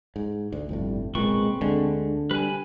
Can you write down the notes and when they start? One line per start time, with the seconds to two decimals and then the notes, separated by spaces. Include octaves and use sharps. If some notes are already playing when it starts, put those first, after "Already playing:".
0.16 G#2
0.52 D2
0.69 G1 F2 A2 G3
1.15 F#1 B1 A#2 G#3 C4 B4 C#6
1.61 D2 D3 G#3 D4
2.31 G3 B4 G#5